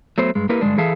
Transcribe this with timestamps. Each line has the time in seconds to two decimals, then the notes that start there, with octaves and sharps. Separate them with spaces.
0.18 F#3 A3 B3 C5
0.35 G2 G#3
0.49 A#3 E4 G4 A#4 B4
0.61 G2 D3 G#3 D4
0.78 E3 G#4 A4 E5 F5 A5